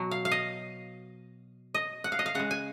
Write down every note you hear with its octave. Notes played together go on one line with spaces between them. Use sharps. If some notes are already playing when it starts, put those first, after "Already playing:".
Already playing: B2 F#3
F5
F5
D#5
D#5
F#5
F5
D#5
F5
C#3 G#3 F#5
G#5